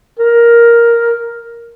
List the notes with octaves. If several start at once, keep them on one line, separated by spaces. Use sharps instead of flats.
A#4